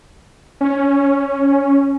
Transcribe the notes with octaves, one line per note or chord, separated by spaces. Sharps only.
C#4